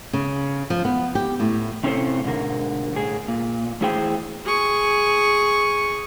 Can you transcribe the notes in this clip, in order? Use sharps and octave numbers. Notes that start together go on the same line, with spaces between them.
C#3
F3
B3
G4
A2
C3 C4 C#4 E4 A4 C5
G#2 B2 D3 A#4
A2 G#4
A#2
E2 A3 E4 G#4 C5 G5
G#4 C#6